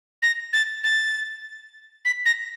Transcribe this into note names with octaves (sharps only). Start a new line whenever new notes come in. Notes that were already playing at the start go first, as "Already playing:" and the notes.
A#6
A6
A6
B6
A#6